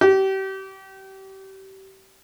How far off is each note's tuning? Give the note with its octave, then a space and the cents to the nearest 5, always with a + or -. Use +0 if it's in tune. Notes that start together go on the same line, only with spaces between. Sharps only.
G4 -30